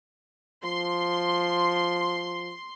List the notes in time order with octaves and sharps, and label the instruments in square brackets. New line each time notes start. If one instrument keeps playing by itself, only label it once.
[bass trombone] F3 [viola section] C6